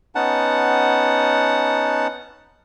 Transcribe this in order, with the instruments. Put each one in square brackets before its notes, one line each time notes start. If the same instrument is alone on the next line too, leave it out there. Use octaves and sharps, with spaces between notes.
[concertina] B3 C#4 D#4 F#5 A5